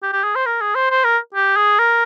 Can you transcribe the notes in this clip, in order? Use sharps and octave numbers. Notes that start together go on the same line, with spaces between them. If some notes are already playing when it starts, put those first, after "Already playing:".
G4
G4
G#4
C5
A#4
G#4
C5
C5
A#4
G4
G#4
A#4